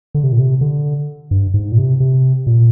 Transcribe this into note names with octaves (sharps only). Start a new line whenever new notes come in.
D3
C3
A#2
C3
D3
G2
G#2
A#2
C3
C3
A#2